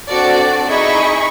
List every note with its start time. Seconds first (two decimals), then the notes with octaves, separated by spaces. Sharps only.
0.11 C4 D4 F#4 A4 D5
0.67 D#4 E4 G#4 D#5 B5 C#6